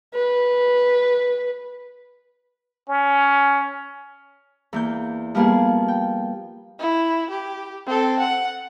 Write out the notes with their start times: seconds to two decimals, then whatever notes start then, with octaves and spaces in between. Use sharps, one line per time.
0.14 B4
2.89 C#4
4.73 E2 A#3 G6
5.35 F3 G3 A#3 B3 G#4
5.88 G5
6.79 E4
7.30 G4
7.86 C4 A4
8.20 F#5